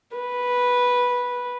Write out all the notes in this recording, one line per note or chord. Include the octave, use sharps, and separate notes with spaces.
B4